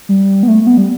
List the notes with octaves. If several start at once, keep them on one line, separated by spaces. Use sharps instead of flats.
G3
B3
A3
A3
B3
G3